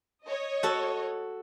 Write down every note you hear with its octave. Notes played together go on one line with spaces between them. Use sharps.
C#5 D#5
F#4 A4